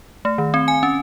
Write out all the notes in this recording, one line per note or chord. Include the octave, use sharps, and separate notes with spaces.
A3
D#3
C4
G#5
C#4